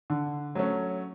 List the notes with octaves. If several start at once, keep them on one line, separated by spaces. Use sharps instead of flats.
D3
F#3 A3 C#4